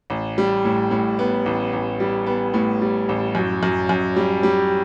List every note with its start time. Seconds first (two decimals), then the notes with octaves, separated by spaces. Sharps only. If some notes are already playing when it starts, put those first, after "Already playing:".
0.10 A1
0.38 G3
0.65 A2
0.91 A2
1.19 B3
1.46 A1
1.73 A1
2.00 G3
2.26 B3
2.54 A2
2.82 G3
3.09 A1
3.35 F#2
3.63 F#2
3.89 F#2
4.16 G3
4.43 G3